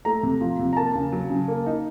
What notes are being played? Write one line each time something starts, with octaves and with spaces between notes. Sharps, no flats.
A3 A#5
C3
F3
C3
A#5
A#3 A5
C#3
F#3
C#3
A#3
D#4